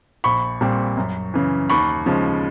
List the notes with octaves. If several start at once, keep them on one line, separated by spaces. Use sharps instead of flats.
A#1 B5 C#6
A#2 G3 C4
F#2
C#3 E3
D#2 B5 C#6
C#3 F3 G#3